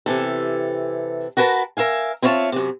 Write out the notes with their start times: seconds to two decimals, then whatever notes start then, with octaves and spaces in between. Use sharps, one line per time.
0.06 C3 E3 A4
1.37 F#4 A#4 B4 G#5 A5
1.77 A#4 E5 F5 G#5
2.22 C4 E4 F4 C#5 E5 A5
2.52 F#2 C3